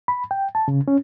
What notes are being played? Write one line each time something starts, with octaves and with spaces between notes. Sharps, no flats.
B5
G5
A5
C#3
C#4